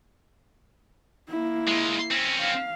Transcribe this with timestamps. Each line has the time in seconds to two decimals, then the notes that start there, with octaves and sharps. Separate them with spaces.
1.29 A#3 E4
1.67 G#3 F4
2.11 C4 C#4
2.41 F5